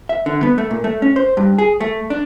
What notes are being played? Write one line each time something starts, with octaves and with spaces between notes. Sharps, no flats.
E5
D3
B3
A3
A#2
A3
C#4
C5
G2
G#4
A3
D4